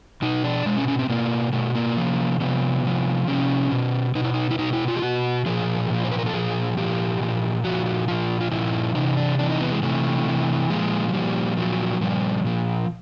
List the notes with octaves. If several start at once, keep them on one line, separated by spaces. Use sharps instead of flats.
B2 D#4
D4
B2 G#3
C#4
C#4
C4
B2 A#3
B2 A3
A#3
C3 F3
C3 F3 B3
C3 F3
C3 F3 C#4
B2
B2 D#4
E4
D#4
E4
B2 D#4
E4
F4
G4
B2 F#4
A#2 F3 G#4
A#2 F3
C5
B4
A#4
A4
A#2 F3 G#4
A#2 F3 G4
A#2 F3
A#2 F3 F#4
F#4
A#2 F3 F4
F4
A#2 F3 E4
C3 E3 D#4
D4
C3 E3 D4
D#4
B3
G#3
C3 E3 A3
C3 E3
A#2 F3 G#3
F#3
A#2 F3 G3
A#2 F3 F#3
A#2 F3 G3
A#2 F3